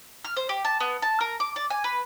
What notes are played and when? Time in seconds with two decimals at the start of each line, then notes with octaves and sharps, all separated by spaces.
0.25 F6
0.37 C5
0.49 G4
0.65 A5
0.80 B3
1.02 A5
1.21 A#4
1.40 D6
1.56 D5
1.70 G#5
1.84 B4